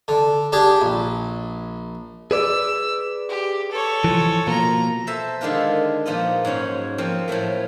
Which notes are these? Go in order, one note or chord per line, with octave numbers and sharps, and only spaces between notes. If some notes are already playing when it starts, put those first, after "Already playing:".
D3
D4 G4 G#4
A#1
G#4 B4 D5 E6
G4
A4 C#5
E3 F3
B2 F3 A#3 A#5
A4 B4 C5 E5 G#5
D3 D#3 G#3 D4 F4 B4
A#2 F3 B3 D#4 F4 D#5
G#2 F#3 C#4 G#4
F3 A#3 C4
A2 F3 F#3 A3